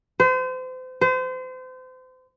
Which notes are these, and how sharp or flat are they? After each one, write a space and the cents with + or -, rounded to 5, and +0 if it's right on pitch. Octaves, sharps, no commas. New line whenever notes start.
C5 -35
C5 -35